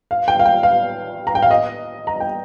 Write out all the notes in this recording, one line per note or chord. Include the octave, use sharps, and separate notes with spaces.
F5
G5
F5
G5
F5
A#5
G5
F5
D#5
A#5
G5